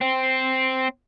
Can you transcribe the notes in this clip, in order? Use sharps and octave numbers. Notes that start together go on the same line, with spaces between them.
C4